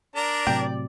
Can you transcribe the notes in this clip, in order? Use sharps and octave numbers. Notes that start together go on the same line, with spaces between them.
D4 A#4 D5 A#5
A2 C3 F#3 G5